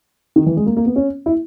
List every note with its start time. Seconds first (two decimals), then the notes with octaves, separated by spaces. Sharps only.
0.36 D#3
0.46 E3
0.57 G#3
0.66 A#3
0.77 A#3
0.86 B3
0.96 C#4
1.26 E4